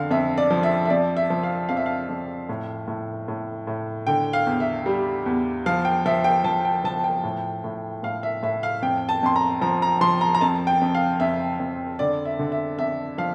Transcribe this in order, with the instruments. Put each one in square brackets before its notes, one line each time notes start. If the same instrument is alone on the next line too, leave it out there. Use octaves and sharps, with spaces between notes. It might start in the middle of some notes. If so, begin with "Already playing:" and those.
Already playing: [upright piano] F2 D3 F5
F2 E5
D5
F3
E5
E5
F2 D5
E5
F3
F5
F2 F5
E5
F5
F2
A2
A2
A2
A2
D3 G5
F5
E2
E5
G3
E2
F3 F5
G5
F3 E5
G5
F3 A5
G5
F3 A5
G5
A2
A2
A2 F5
E5
A2 E5
F5
F2 G5
A5
F2 C6
A#5
F3 A#5
A#5
F3 C6
A#5
A#5
F2 A5
G5
F2
F5
F2 E5
F2
D3 D5
E5
D3
E5
F2 E5
F3 F5